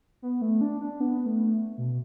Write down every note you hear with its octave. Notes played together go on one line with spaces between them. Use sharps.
B3
A3
D4
D4
B3
A3
B2